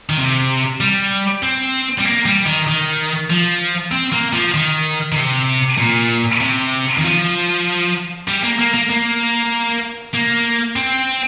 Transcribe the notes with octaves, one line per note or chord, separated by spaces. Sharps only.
D#3
C3
G3
C4
G3
A#3
G3
D#3
D#3
F3
C4
A#3
F3
D#3
D#3
C3
A#2
C3
D#3
F3
G3
A#3
A#3
A#3
A#3
A#3
C4